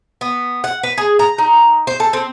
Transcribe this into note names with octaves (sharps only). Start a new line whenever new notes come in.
B3
F#5
B4
G#4
A#5
D#4
C5
A4
C4